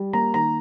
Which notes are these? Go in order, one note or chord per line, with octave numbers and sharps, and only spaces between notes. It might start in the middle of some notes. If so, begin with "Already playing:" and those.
Already playing: G3
A#3 A#5
D#3 A#5